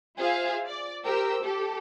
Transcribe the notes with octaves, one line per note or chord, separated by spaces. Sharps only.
F4 G#4 C5 E5 F5
D5
G4 A#4 C5 G5 E6
G4 A4